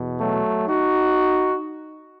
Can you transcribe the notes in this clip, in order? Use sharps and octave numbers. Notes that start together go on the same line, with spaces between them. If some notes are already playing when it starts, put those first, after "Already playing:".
Already playing: E2 B2
F#3 A3
D#4 F#4